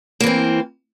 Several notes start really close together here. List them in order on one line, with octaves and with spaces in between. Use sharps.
A#3 E3 C4